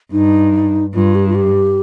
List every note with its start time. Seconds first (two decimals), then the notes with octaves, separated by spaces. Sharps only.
0.12 G2 D#4
0.94 G2 F4
1.15 G4
1.28 F4
1.35 G4